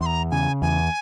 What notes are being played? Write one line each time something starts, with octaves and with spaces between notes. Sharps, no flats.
E2 C6
A#5
C#3 G#5
E2 G#5